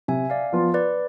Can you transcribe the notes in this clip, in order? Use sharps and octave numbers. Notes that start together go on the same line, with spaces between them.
C3 E5 G#5
D5 F5
F3 B3 F4
B4 D5